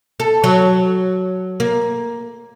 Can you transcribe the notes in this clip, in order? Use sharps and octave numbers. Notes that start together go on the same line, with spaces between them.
A4
F#3
A#3